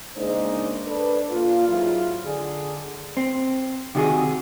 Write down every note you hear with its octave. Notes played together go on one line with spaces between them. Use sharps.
C#3 G#3 A#3 D4 D#4 C5
D4 A4 B4
A#2 F4
G#2 F#3 E4 F4
D3 G#4
C4
C3 D#3 F#4 G#4